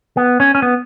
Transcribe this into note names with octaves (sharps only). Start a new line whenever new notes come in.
B3
C#4
C#4
B3